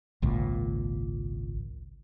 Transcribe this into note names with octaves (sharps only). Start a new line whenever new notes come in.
G#1 C#2 A#2